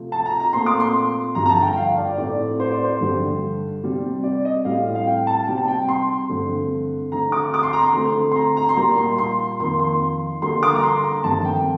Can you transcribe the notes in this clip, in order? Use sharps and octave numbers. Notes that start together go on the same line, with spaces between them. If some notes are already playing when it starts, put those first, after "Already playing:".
Already playing: C3 F3 A3 C4
A5
A#5
A#5
A#2 A3 C4 C6
D6
C6
G2 D3 F3 A#5
A#5
A5
G5
G5
F5
D5
A2 A3 C4 D5
C5
D5
C5
G2 D3 G3
C3 G3 C4
D5
D#5
A2 G3 C4 F5
F5
G5
A5
C3 G3 C4 G5
A5
G5
C6
G2 D3 A3 C4
D3 A3 C4 A#5
D6
D6
C6
A#5
C6
D3 A3 C4
C6
A#5
A#5
C6
A#2 G3 A#3 A#5
C6
C6
F2 D#3 A#3 C6
C6
D3 G3 A#3 C6
D6
A#5
C6
A#5
G2 D#3 A3 C4 A5
G5